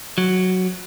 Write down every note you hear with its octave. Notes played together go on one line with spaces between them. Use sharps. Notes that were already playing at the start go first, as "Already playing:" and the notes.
F#3